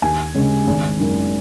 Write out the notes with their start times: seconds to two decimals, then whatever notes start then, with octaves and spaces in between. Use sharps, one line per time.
0.02 D#2 G#5
0.34 C#3 G#3 C#4
0.67 G#1
0.99 F#2 D#3 A#3